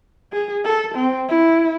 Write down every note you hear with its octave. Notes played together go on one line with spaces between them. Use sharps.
G#4
A4
C4
E4